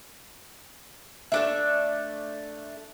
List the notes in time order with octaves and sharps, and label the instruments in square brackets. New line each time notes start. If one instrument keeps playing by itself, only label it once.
[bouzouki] A3 D4 E5